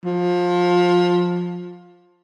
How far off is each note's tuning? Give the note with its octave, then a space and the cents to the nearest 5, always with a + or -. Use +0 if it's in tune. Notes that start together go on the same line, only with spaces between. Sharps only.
F3 +20